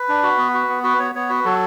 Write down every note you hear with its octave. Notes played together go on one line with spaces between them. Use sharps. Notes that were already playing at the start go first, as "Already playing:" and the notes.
Already playing: B4
D4
F#4
B3
F#4
B3
F#4 B4
B3 C#5
B3 C#5
F#4 B4
F#3 A4